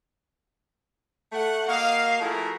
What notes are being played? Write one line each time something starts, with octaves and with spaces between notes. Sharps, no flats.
A3 F#5
A#3 F#4 A#4 D#5 F5
F3 A3 E4 F#4 G#4 A#4